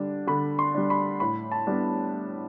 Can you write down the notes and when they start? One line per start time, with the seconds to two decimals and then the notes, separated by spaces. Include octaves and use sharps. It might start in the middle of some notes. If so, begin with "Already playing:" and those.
Already playing: D3 G3 D4
0.27 D3 B5
0.59 C6
0.75 G3 D4
0.90 B5
1.20 A2 B5
1.52 A5
1.67 G3 B3 D4